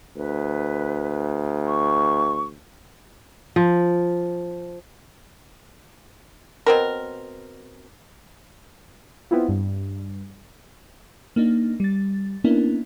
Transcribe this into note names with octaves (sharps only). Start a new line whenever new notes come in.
D2 B4
C#6
F3
B2 C4 A#4
B3 C4 E4 F4
G2
A#3 D4 D#4
G3 A6
A#3 B3 C#4 D4 E4 A#4